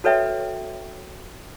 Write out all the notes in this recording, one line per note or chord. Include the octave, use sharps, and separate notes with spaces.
F#4 A4 B4 C#5 E5 G5